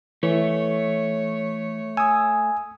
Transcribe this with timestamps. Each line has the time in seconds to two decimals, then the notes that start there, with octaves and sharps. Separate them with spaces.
0.23 E3 A3 C#5
1.97 G#5 D#6 E6